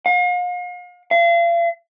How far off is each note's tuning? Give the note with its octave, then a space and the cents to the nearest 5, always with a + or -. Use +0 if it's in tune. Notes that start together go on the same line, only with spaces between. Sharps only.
F5 +40
F5 -40